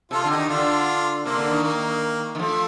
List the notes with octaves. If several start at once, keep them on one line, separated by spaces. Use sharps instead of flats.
C3 F4 A4
D3 A4
D#4 G4
D#3
D3 D4 F4
C3 A#3 D4
D3
D#3
A#3
D#3
F3 A3